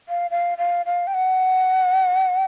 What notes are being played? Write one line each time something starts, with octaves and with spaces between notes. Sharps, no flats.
F5
F5
F5
F5
G5
F#5